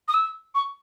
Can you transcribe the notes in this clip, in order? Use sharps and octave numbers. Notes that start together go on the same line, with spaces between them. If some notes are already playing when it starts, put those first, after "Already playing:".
D#6
E6
C#6